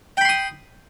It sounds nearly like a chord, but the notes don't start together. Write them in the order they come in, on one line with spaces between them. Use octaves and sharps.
G5 B5 C6 D#6